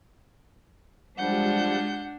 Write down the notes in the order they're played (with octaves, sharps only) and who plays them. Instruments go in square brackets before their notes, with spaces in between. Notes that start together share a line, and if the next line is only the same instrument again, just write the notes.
[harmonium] F3 G3 [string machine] G#3 F4 G4 [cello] D4 [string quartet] F#5 G6